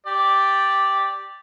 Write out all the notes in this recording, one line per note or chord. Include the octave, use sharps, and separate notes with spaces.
G4 D5